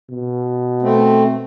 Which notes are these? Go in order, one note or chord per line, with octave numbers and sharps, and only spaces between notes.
B2
A3 C4